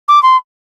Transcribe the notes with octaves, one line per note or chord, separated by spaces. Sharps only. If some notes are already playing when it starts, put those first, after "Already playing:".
D6
C6